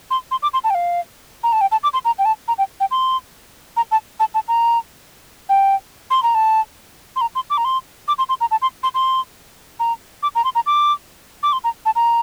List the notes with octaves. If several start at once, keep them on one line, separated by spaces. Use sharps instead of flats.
C6
C6
D6
C6
A5
G5
F5
A#5
A5
G5
A5
D6
C6
A#5
G5
A5
A#5
G5
G5
C6
A#5
A5
A5
A5
A#5
G5
C6
A#5
A5
C6
A#5
C6
D6
A#5
C6
D6
C6
C6
A#5
A5
C6
C6
C6
A#5
D6
A#5
C6
A#5
D6
D6
C6
A#5
A5
A#5